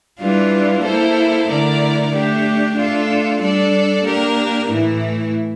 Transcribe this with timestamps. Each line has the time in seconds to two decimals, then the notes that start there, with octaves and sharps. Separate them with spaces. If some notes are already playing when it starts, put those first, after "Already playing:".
0.19 E3 G3 D4 F4
0.82 A#3 E4 A4 C5
1.46 D3 A3 E4 A#4 D5
2.11 A3 D4 G4
2.75 A3 D4 F4 A4
3.40 G3 D4 A4 D5
4.04 A#3 D4 G4 A#4
4.68 A2 E3 A3 E4